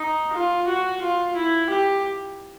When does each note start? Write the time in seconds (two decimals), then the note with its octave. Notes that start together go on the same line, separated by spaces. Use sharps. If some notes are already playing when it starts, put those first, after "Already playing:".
Already playing: D#4
0.33 F4
0.67 F#4
1.02 F4
1.36 E4
1.70 G4